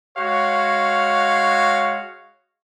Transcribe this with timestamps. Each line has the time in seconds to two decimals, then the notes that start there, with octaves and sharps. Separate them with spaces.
0.18 G#3 F#4 C#5 F5